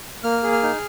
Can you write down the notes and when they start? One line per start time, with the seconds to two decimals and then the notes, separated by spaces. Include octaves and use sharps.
0.23 A#3 F6
0.43 G#4
0.52 F6
0.63 D#4